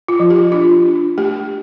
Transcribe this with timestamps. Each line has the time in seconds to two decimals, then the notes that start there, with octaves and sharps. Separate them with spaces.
0.08 F4
0.20 F3
0.30 G4
0.52 D4 F4
0.85 D4
1.18 A3 G4